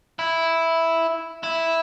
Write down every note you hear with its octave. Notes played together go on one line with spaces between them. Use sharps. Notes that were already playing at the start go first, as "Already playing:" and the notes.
E4
E4